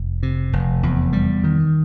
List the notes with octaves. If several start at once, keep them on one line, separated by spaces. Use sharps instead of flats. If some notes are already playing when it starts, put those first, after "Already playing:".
Already playing: F1
C3
F1
E2
G3
D#3